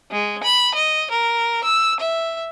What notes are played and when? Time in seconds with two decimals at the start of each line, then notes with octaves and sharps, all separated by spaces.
0.12 G#3
0.43 B5
0.74 D#5
1.11 A#4
1.64 E6
2.00 E5